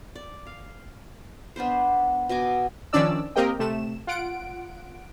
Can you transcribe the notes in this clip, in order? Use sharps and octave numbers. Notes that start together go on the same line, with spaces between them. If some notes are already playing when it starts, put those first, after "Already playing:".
D5
F5
B3 D4 B4 C5
B2 D#5 G#5 D6
D#3 F3 C#4 D4 D5 E6
A#3 C4 G4 A#4 D#5 G5
C3 A3 E7
F4 F#5 D7